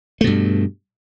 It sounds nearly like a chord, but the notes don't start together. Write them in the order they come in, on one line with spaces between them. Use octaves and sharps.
A3 B2 G2